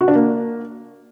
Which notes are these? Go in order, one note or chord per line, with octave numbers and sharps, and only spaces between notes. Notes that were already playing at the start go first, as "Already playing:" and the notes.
F#4
D4
A#3